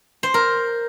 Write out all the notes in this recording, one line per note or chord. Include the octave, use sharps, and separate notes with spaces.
C5
A#4